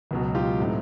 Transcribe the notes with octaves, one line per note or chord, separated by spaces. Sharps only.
C#2 B2 F#3
F4 G4
A2 F#3 A3 C4 D#4